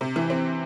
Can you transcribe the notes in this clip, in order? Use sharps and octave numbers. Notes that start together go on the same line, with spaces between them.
C3
E3
C4